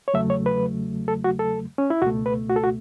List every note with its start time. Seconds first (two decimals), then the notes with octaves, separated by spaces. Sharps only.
0.08 C#5
0.14 E2 C#3 F#3 A3 E5
0.30 C#5
0.46 B4
1.08 A4
1.24 F#4
1.39 A4
1.78 C#4
1.90 E4
2.02 C#2 B2 A3 F#4
2.26 B4
2.49 F#4
2.56 A4
2.64 F#4